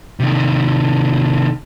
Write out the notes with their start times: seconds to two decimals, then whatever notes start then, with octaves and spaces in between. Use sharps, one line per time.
0.20 C3 D#3